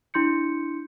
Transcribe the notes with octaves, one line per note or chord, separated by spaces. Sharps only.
D4 E4 C6 G6 C#7